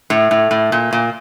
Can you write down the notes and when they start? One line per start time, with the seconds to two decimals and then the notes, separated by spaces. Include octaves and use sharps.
0.10 A2
0.31 A2
0.51 A2
0.72 A#2
0.93 A#2